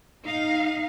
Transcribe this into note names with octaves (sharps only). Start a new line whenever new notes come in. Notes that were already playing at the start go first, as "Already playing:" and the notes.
D#4 F5